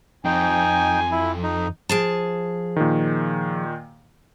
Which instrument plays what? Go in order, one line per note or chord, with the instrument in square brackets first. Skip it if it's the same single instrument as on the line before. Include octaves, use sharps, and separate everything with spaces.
[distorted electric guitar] F2 [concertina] D#4 G5 [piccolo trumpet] G#5
[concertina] E4
D#4
[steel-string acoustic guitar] F3 G#4 A5
[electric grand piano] A#2 D#3